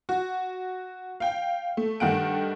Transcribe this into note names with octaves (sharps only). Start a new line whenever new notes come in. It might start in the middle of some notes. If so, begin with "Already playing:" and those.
F#4
F5 G5
A3
G2 D#3 A3 F#5 D7